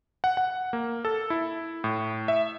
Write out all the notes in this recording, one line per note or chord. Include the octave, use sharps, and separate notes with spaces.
F#5
F#5
A#3
A4
E4
A2
E5